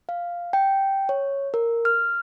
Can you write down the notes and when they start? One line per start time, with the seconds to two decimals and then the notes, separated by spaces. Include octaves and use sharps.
0.09 F5
0.53 G5
1.09 C#5
1.54 A#4
1.85 F6